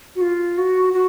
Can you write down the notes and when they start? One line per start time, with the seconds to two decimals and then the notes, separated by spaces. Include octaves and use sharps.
0.16 F#4
0.21 F4
0.58 F#4
0.93 F#4